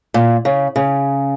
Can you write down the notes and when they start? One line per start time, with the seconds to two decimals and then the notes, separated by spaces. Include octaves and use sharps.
0.14 A#2
0.45 C#3
0.76 C#3